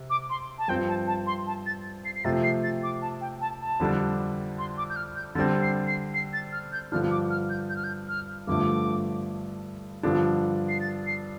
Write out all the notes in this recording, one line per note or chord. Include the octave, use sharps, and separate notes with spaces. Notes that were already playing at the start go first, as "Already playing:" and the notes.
Already playing: C3
D6
C6
A5
G2 F3 C4 G5
A5
A5
C6
A5
A6
C7
C7
C3 F3 A3 C4 A6
C7
A6
D6
A5
G5
A5
A5
F2 D3 G3 D4
C6
D6
G6
F6
G6
D3 G3 C4 A6
C7
C7
C7
A6
F6
G6
G2 D3 F3 D4 F6
D6
F6
G6
G6
F6
G6
F6
G2 D3 F3 A3 D6
G2 D3 F3 D4
C7
A6
C7